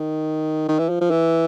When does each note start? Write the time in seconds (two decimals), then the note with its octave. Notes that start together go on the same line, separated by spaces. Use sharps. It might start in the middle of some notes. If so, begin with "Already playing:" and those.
Already playing: D#3
0.69 D#3
0.79 E3
0.89 F3
1.01 F3
1.11 E3